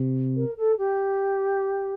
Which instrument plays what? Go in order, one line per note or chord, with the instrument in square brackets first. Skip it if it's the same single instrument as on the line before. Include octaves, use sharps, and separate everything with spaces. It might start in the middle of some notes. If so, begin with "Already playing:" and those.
Already playing: [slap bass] C3
[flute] A#4
A4
G4